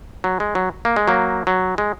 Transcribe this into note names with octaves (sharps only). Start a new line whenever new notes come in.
F#3
G#3
F#3
A#3
G#3
F#3 A#3
F#3
G#3